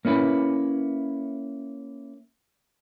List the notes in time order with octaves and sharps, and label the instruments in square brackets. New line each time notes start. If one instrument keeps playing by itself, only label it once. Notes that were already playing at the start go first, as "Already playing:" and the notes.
[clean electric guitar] A#3 C#4 E4 B4